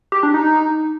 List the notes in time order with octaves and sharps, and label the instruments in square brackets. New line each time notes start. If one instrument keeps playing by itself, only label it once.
[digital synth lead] G4
D4
D#4